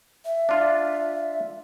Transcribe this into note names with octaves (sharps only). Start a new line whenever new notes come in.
E5
D4 F4